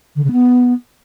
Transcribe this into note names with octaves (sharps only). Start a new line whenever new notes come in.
D3
C#3
B3